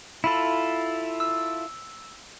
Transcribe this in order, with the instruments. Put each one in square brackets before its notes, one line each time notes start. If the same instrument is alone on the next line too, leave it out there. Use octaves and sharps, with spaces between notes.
[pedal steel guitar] E4 F4 A4 [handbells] B5
[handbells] E6